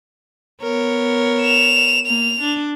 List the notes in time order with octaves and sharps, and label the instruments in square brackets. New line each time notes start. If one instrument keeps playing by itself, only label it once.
[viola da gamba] B3 A#4 C#5
[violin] E7 F7
[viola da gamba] A#3 [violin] F7
[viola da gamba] D4